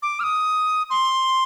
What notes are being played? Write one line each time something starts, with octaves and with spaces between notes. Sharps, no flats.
D6
F6
D#6
C6